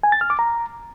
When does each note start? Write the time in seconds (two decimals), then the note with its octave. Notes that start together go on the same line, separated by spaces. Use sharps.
0.03 G#5
0.12 A6
0.21 F6
0.30 D6
0.39 A#5